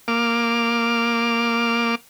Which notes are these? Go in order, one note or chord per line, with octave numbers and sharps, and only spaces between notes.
A#3 D6 F6